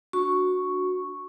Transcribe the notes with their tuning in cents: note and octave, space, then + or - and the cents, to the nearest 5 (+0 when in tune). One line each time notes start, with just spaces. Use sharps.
D4 +0 F#4 -10 C#6 +0